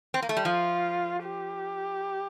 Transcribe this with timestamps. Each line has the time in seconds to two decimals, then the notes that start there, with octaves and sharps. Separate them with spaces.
0.14 C4
0.22 A#3
0.29 A3
0.37 G3
0.45 F3 F4
1.24 G4